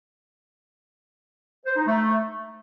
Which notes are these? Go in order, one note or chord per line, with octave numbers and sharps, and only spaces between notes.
C5
D#4
A3